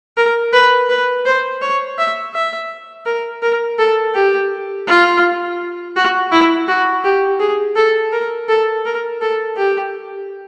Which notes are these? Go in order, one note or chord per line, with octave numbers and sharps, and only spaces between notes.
A#4
B4
B4
C5
C#5
E5
E5
A#4
A#4
A4
G4
F4
F#4
E4
F#4
G4
G#4
A4
A#4
A4
A#4
A4
G4